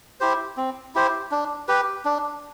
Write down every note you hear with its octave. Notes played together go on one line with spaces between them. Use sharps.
E4 G4 C5
C4
E4 G4 C5
D4
G4 B4
D4